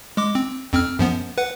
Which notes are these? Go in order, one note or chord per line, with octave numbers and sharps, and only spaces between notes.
G#3 D6
C4
F2 C4 F6
F#2 F3 B3
B4 F#5